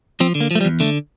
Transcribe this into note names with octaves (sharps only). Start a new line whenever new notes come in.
F3 C4
D3
A#3
F3 A3
G3
E2
D3 A3